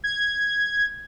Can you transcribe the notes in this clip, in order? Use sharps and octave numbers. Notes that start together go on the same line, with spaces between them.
G#6